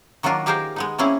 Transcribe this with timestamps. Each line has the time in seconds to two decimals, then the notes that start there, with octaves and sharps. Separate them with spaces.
0.23 D#3 F#3 A#3 D4 F4 A#4
0.46 D#4 G4 G#4 A#4 C5 F5
0.76 G#3 B3 D#4
0.99 A#3 C4 C#4 E4 G#4